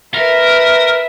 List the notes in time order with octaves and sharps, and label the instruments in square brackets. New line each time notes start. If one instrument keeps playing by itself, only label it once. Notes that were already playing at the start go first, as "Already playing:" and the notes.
[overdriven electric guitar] A#4 [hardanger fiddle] B4 E5